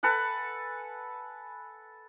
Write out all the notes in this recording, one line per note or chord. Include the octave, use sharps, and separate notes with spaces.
A4 B4 F#5 G#5